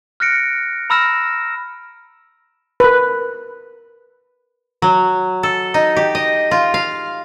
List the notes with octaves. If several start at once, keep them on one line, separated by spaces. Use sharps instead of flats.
F6 F#6 A#6 C#7 D7
A#5 B5 E6 F6 A#6 E7
A#4 B4
F#3
A4
D#4
G4
D#5
F4
F5